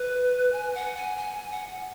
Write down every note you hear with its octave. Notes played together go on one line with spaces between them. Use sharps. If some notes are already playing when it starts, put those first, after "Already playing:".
Already playing: B4
G#5
F#5
G#5
G#5
F#5